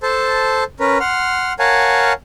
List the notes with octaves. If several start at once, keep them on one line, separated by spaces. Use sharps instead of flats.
A4 C5 A5
C#4 A#4 B4
F#5 C6 F6
A#4 C#5 F5 F#5 G#5 A5